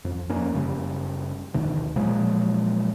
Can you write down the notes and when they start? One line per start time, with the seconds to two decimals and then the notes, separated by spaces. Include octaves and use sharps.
0.05 F2
0.30 F2 A#3 C#4
0.53 F#1 C#3 G3
1.54 G1 D2 B2 D#3
1.96 A#2 F3 F#3 G#3